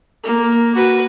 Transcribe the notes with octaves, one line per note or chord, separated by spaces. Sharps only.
A#3
F#4 B4